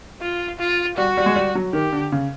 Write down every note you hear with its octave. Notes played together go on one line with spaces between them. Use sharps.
F4
F4
G3 F#4
G3
G#3
G3
F#3
D#3 G4
D3
C#3